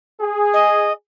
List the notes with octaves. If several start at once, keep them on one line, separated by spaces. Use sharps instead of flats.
G#4
D#5